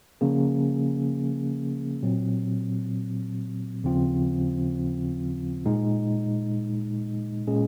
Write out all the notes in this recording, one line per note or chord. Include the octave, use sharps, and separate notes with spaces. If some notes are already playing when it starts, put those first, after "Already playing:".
C#3 F3 A#3 C#4 G#4
A#2 F#3 C4
D#2 C#3 F3 C4 F4
A#2 G#3 D#4
A#2 G#3 C#4 G#4